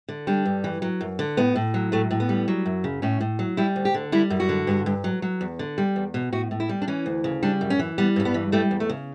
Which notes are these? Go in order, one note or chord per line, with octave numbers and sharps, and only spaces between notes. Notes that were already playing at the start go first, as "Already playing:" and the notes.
D3
G3 D4
G2
E3
F#3
F#2
D3
A2 B3
A2
F#3
A2 A3
A2
B3
G3
F#3
F#2
C#3
A2 C#4
A2
F#3
G3 E4
D2
G4
D3
G3 E4
F#2
F#4
D3
G2
G2
F#3
F#3
E2
D3
G3
E2
B2
A2 F#4
A2
E4
G3
D4
E3 C#4
D2
C#3
G3 D4
F#2
C#4
E3
G3 B3
G2 C#4
B3
E3
G3 A3
E2
A3
C#3